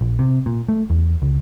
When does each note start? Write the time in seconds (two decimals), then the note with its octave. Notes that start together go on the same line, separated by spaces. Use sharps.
0.01 A#1
0.19 C3
0.46 A#2
0.69 A3
0.90 E2
1.22 C#2